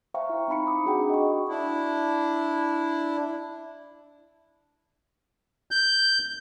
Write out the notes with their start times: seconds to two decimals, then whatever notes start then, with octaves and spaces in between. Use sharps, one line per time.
0.14 C5 E5 F5 G5 A#5 C#6
0.29 E4
0.48 C4 D#4 B5 C#7
0.66 A#5 D6 D#6
0.86 D4 F#4 G#4 F#5 G5
1.10 D#5 C#6
1.49 D4 E4
5.71 G6